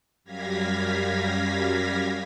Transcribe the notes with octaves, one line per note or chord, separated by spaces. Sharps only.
F#2 G3 F5 G#6 A#6 B6